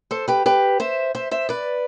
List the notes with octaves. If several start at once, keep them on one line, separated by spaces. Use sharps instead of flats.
A4 C5
G4 B4
G4 B4
C5 E5
C5 E5
C5 E5
B4 D5